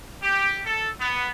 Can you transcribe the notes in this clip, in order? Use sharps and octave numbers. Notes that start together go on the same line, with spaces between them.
G4
A4
B3